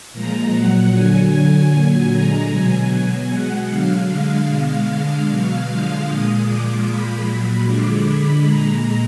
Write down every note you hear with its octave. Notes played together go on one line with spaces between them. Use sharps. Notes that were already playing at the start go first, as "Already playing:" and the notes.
A#2 F3 G#3 A#5
A#2 F#3 F#5
D3 F#3 G#5
D3 F#3 G#5
A#2 F#3
D3 G#3 A#5
B2 F#3 G#5
B2 F#3
B2 G#3 F#5
D3 F#3 F5
D3 G#3
B2 G#3
D3 G#3
B2 F#3 F5
D3 F3 G#3 F5
A#2 G#3 D#6
A#2 F3 G#3 D6
A#2 F3 G#3 B5
A#2 F#3
D3 F3 G#3 D6
D3 G#3 B5
A#2 G#3 A#5